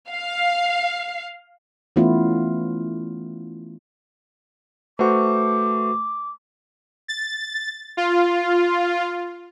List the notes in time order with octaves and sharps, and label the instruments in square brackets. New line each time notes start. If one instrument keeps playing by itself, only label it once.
[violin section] F5
[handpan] E3 A3 B3 C#4 E4 F4
[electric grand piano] A3 C5 C#6 [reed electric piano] F#4 B4 [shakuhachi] D6
[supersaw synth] A6
F4